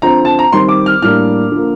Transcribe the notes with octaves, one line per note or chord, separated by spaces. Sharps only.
D3 F3 C4 A#5
A5
A#5
D#3 G3 C4 C6
D6
F6
A2 G3 A#3 D4 F6
D3 F3 A#3